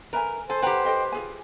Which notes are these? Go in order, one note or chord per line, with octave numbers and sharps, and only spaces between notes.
A#4 B4 E5 G#5
A4 C5 G#5
G4 B4 F#5 G5 A#5
A4 D#5 G5
F4 G#4 G#5